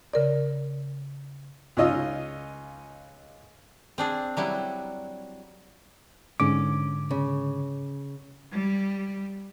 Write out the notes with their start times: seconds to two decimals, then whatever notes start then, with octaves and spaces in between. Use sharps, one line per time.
0.14 C#3 A#4 D5
1.77 C#2 C#4 D#4 F4 D#5 E6
3.98 C4 D4 G#4
4.37 F#3 G3 E4
6.40 G#2 D3 C#4 D6
7.11 C#3
8.52 G3